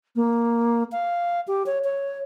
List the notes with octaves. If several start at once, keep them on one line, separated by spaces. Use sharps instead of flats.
A#3
F5
G4
C#5
C#5